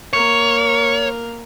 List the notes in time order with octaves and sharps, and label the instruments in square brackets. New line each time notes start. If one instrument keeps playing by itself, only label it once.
[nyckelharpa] A#3 A#4 [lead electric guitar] C#5